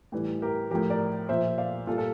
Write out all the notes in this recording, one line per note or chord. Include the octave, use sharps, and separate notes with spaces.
A2 E3 G3
G4 A#4
A2 F3 G4 A#4
A#4 D5
A#2 F3 C5 E5
D5 F5
A#2 G3 F4 A4
A4